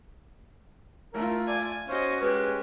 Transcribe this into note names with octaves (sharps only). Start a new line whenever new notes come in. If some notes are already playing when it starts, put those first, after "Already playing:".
A3 F4 A#4
D5 G#5
C#4 F#4 C5 D#5
G#3 C#4 G4 B4